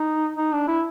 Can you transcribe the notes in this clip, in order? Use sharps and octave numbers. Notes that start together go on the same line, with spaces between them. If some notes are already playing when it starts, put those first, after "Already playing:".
Already playing: D#4
D#4
D4
E4